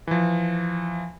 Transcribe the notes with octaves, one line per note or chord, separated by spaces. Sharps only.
E3 F3